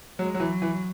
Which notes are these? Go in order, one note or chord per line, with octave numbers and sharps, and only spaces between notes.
F#3 G#3
F#3
E3
F#3
E3